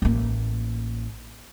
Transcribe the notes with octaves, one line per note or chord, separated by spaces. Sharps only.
A1 A#3